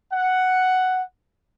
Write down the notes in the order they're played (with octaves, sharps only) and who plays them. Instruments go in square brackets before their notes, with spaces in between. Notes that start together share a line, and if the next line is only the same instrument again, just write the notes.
[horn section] F#5